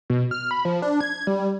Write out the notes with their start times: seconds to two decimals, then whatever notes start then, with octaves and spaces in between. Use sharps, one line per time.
0.10 B2
0.31 F6
0.51 B5
0.65 F3
0.82 D4
1.01 G#6
1.27 G3